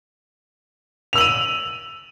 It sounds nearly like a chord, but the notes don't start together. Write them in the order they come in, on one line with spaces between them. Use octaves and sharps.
F7 E6 F#7 D#7